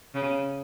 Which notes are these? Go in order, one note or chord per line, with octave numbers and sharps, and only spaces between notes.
C#3